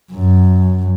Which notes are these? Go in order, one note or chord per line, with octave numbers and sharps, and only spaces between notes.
F#2